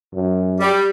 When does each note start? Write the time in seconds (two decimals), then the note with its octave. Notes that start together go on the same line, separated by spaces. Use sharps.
0.14 F#2
0.60 G3